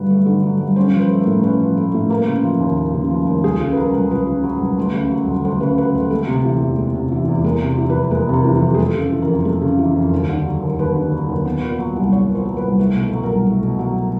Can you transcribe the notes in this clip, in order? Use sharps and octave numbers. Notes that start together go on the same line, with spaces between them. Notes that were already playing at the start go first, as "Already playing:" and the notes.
Already playing: G2 D3 F#3 A3 B4
A3
D3
F#3
G2
C#4 C5
F3
B4
A3
A#4
A2
C#4 B4
F3
A3
A2
A#3
C#3
F3
D#2
A#3
C#3
F3
D#2
C#2 G#4
C#3 A4
B4
F#3 A#4
C#2 A#4
C#2 B4
C#3
F#3
C#2
D2
C#3
F#3
D2
D2 C5
C#3 B4
F#3 B4
D2 A4
G#3 A4
C3
E3
E2
G#3
C3
E3
E2
G#3 A#4
C3
E3
B4
F2
G#3 A#4
C3 A#4
E3
A4
F2
G#4
G#3 A4
C#3
A4
E3
A#4
F2
A#4
G#3 A4
C#3
E3
F2
D#2
D3
F#3
D#2
D#2 B4
D3
F#3
D#2
B3
A#2
F#3
C2
B3 C#5
A#2
C5
F#3
B4
C2
A3 A4
B2
A4
F#3
A#4
C2
A3
B2
F#3